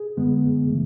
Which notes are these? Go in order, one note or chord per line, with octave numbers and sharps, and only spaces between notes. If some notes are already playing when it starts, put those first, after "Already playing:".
Already playing: G#4
F#2 D3 G#3 B3
C#3 E3 A3